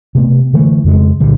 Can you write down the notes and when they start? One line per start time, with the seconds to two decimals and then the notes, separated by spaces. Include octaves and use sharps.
0.15 C3 A3 B3
0.53 D3 E3 A3
0.84 F2 C#3 G#3
1.20 C#2 A#2 D3 G3